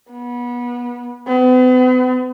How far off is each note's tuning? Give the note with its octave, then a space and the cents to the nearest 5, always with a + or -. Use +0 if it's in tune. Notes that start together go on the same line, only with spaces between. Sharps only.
B3 -25
B3 +45